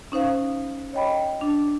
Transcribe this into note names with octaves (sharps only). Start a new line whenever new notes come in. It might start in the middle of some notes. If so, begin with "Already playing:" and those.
C#4 D#4 C5 F5
C#5 D#5 G5 B5
D4